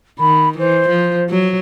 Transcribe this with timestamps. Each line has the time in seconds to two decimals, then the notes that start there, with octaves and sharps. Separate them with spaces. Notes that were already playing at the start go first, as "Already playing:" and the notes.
0.19 D#3 B5
0.59 E3 C5
0.89 F3
1.30 F#3